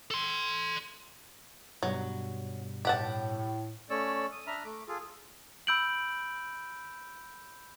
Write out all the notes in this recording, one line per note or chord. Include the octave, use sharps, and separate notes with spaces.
A4 C6
G2 B2 F#3 G3
A2 G4 F#5 A5
A3 C#4 C#5 D5 E6
D#6
D4 E5 A#5 B5 F6
A3 D6
F4 G#4 A4
B5 E6 G6 D7 F#7